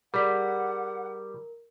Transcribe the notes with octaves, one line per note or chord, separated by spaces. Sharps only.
G3 G#4 A#4 D5 F#5 B6